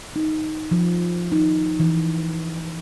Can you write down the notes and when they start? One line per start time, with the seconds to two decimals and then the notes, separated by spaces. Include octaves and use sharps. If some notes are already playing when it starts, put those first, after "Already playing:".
0.16 D#4
0.71 F3
1.32 D#4
1.80 E3